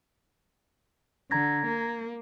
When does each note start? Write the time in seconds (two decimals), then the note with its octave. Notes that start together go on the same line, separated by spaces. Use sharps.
1.31 D3 A#5 G#6 A#6
1.67 A#3